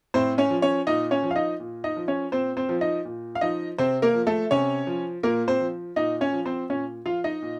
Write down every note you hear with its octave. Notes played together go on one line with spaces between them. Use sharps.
A2 C4 C5
C#4 C#5
F3
C#4 C#5
A#2 D#4 D#5
C#4 C#5
F3
F5
D#4 D#5
A#2
D#4 D#5
F3
C#4 C#5
A#2 C4 C5
C4 C5
F3
D#4 D#5
A#2
F5
F3 D#4 D#5
C3 C4 C5
A#3 A#4
F3
A3 A4
C3 C#4 C#5
F3
A#2 A#3 A#4
C4 C5
F3
A#2 D#4 D#5
C#4 C#5
F3
C4 C5
A#2 C#4 C#5
F3 F4 F5
D#4 D#5
A#2